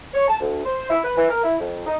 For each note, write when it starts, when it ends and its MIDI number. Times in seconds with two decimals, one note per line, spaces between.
0.13 0.26 73
0.28 0.35 81
0.40 0.61 38
0.64 0.86 72
0.90 0.99 64
1.04 1.14 71
1.17 1.29 52
1.30 1.42 70
1.43 1.55 64
1.59 1.84 41
1.86 1.95 63